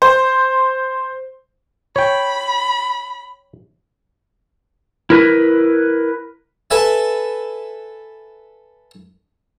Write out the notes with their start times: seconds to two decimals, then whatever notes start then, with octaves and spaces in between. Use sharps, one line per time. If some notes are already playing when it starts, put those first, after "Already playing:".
0.02 C5
1.96 C#5 G5 B5
5.10 E4 A#4 B4
6.71 A4 B4 E5 G#5